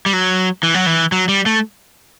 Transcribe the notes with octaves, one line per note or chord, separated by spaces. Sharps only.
G3
F#3
E3
F#3
E3
F#3
G3
A3